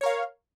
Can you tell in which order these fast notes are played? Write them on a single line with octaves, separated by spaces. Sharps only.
C#5 A#4 F5